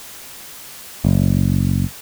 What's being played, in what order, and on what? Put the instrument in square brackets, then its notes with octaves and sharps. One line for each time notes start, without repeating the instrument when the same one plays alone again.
[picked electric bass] F#1